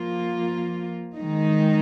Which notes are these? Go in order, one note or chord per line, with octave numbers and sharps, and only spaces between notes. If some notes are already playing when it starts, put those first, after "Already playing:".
Already playing: F3 A#3 F4
D#3 G#3 D#4